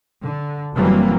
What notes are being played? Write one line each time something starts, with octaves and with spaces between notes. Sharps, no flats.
D3
F#1 E3 F#3 G3 A#3 C4